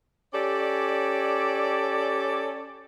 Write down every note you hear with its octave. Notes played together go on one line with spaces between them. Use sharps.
C#4 G4 A4 D5